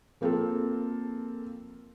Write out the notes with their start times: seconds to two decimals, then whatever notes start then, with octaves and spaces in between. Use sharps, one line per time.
0.21 F3 A#3 C4 F4 G#4 A4